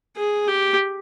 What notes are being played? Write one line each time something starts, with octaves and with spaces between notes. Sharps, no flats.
G#4
G4